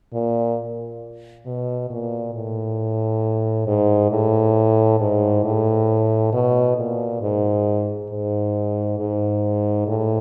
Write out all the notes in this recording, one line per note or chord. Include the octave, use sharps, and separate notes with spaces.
A#2
B2
A#2
A2
G#2
A2
G#2
A2
B2
A#2
G#2
G#2
G#2
A2